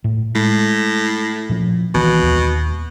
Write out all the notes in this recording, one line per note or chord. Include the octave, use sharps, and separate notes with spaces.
A2
A2 G#3
A#2 F3 C#4
C2 B2 D#3 E3
D#1 D#2